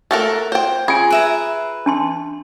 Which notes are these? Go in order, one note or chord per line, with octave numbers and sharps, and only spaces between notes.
A3 A4 A#4 F#5
C5 G5
F4 G#4 G#5
B4 E5 A#5
D4 A5 C6